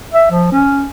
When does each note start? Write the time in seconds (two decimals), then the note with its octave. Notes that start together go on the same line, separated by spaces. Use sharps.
0.13 E5
0.30 F3
0.52 C#4